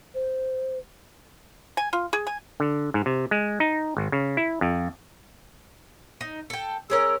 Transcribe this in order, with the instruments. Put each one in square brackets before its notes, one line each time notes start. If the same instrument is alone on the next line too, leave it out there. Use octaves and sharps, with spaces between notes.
[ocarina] C5
[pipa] G#5
F4
G#4
G#5
[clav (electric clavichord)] D3
G#2
C3
G#3
D#4
G#1
C#3
E4
F2
[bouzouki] D#4
A4 G5
[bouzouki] G#3 C#4 A#4 [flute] E6